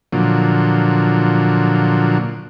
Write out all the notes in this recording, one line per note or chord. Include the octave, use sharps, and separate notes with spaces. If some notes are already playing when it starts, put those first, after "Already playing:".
A#2 D3 F3 F#3